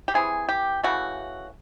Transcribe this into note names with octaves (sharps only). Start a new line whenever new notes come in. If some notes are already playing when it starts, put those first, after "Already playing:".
G4
E3 G3 C4 G#4
G4
C#3 E3 A3 F#4